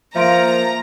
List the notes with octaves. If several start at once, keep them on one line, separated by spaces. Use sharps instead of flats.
F3 A#3 E5 A#5 C6 D7